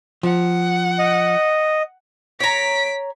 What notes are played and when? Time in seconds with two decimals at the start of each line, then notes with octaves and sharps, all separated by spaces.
0.23 F3 F#5
0.99 D#5
2.40 C#5 A#5 B6 D7